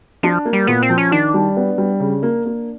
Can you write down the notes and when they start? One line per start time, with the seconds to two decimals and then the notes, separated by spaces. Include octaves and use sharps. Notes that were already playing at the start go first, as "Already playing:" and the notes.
0.23 F3 D4
0.45 A#3
0.53 G3
0.67 A#2 B3
0.83 C4
0.90 F3
0.98 C#4
1.12 D#3 D4
1.34 G3
1.57 B3
1.78 G3
2.00 C#3
2.23 A#3
2.45 A#3